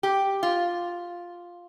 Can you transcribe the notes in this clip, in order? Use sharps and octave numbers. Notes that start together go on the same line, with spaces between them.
G4
F4